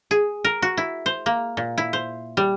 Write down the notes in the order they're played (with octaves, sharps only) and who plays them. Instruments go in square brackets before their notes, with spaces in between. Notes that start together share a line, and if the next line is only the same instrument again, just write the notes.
[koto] G#4
A#4
F#4
E4
C5
A#3
A#2
E4
C5
G3